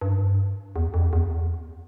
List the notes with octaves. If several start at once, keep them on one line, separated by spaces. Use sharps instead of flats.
G2
E2
F2
E2